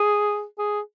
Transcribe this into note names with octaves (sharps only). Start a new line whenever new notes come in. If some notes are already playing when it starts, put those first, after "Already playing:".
Already playing: G#4
G#4